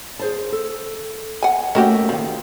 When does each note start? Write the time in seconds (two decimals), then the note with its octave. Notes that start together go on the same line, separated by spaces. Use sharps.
0.19 G#4 C5 A5
0.52 A4
1.42 F#5 G#5
1.75 A3 A#3 C#4 F#4 G4
2.09 D#3 F3 B3